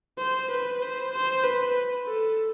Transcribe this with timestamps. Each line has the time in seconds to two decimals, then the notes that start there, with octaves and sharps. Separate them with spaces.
0.19 C5
0.51 B4
0.82 C5
1.13 C5
1.44 B4
2.07 A4